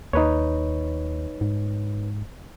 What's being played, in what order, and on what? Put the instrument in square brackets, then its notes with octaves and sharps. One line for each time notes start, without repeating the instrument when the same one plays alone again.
[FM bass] D#2 [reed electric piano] D#4 B4 C#5
[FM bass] G#2